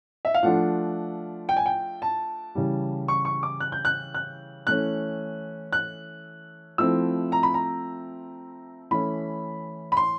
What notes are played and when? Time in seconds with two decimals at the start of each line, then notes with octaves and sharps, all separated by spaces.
0.25 E5
0.34 F5
0.43 F3 A3 D4 F4 F#5
1.49 G5
1.56 G#5
1.66 G5
2.02 A5
2.55 C#3 E3 G3
3.08 C#6
3.25 C#6
3.43 D6
3.60 F#6
3.72 G6
3.85 F#6
4.15 F#6
4.67 E3 A3 C#4 F#6
5.73 F#6
6.78 F3 A3 C4 E4 E6
7.32 A#5
7.43 B5
7.54 A#5
8.91 E3 A3 C#4 E4 B5
9.92 B5
9.97 C6